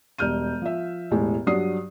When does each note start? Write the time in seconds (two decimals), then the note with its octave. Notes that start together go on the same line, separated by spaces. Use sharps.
0.18 E1 G3 F6 G6 D#7
0.62 F3 E5
1.11 E1 A2 G#3 G4
1.47 G2 F#3 D4 D#6 C7